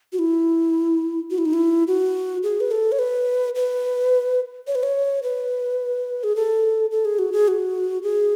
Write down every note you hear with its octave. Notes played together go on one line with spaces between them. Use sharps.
F#4
E4
F#4
E4
D#4
E4
F#4
G#4
B4
A4
C#5
B4
B4
C#5
B4
C#5
B4
G#4
A4
A4
G#4
F#4
G#4
F#4
G#4